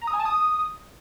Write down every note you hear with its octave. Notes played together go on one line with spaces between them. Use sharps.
A#5
D#6
G#5
A5
D#6